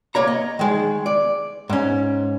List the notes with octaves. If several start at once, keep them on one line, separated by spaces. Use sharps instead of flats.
A#3 C#5 A#5
D#5
D#3 G#3
D5
G#2 C#4